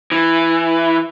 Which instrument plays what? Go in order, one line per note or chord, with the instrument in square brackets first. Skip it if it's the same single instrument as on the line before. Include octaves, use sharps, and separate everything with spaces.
[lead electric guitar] E3